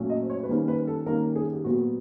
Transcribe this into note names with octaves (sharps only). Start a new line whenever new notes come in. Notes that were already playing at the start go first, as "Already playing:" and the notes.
Already playing: A#2 F#3 A3 C#4
D#5
C5
C#5
B4
D#3 G3 A#3 C#4 C5
B4
A4
D#3 G3 A#3 C#4 A#4
G#4
G4
A#2 F#3 B3 F#4